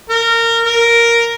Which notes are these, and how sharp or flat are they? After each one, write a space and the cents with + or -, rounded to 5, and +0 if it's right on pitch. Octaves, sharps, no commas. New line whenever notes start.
A#4 -20
A#4 +0